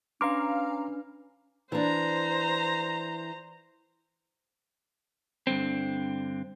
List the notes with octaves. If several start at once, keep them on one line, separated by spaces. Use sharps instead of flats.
C#4 D4 B4 F5 A#5 C6 D6 F6
E3 D4 C5 A#5
G2 D3 C4